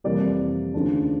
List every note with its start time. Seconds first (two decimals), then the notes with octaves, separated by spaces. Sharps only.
0.04 F2 C3 E3 G3 A#3 D5
0.74 D#2 C#3 F3 A3 D4